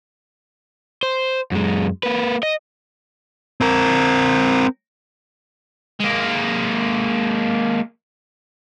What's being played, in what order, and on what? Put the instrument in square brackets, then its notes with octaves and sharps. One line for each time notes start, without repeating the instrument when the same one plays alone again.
[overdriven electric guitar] C5
F#2 G#3
A#3 B4
D#5
[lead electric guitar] C4 A#4
[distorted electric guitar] G#3 A#3